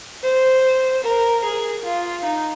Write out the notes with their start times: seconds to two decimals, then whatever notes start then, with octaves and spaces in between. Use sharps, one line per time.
0.23 C5
1.03 A#4
1.44 G#4
1.84 F4
2.24 D#4